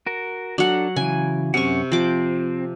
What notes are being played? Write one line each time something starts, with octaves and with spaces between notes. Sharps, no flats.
F#4 A#4
F#3 D4 A4 F#5
C#3 E3 G#5
F#2 C3 C#4 F#5 C#6
F3 C4 D6